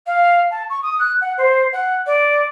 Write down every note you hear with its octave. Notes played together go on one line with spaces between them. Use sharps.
F5
A5
C#6
D#6
F#6
F#5
C5
F#5
D5